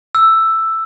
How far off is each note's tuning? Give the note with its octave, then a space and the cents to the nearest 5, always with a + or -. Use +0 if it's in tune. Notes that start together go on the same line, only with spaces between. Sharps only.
E6 +5